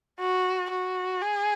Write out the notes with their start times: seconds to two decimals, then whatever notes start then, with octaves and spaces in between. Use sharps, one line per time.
0.19 F#4
0.70 F#4
1.22 G#4